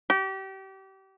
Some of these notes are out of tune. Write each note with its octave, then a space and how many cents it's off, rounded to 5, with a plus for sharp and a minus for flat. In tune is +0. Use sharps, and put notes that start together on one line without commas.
G4 -30